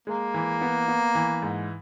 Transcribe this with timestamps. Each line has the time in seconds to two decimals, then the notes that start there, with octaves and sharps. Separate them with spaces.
0.07 G#3 A#3
0.34 E3
0.61 B3
0.88 B3
1.15 E3
1.42 G#2